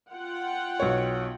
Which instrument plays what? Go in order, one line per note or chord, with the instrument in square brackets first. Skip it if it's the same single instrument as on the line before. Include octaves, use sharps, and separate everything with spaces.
[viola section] F4 F#5 G5
[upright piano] B1 C#5